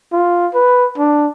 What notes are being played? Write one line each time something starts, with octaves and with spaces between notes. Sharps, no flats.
F4
B4
D4